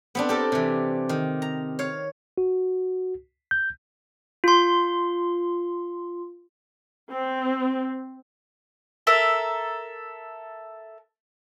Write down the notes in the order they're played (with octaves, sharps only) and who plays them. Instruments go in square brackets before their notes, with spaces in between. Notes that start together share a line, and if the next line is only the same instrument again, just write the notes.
[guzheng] B3 C4 D4
G4 A4 A#4
C3 E3
D#3
A#5
C#5 F5
[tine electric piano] F#4
G6
[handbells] F4 C6
[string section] C4
[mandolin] A4 A#4 E5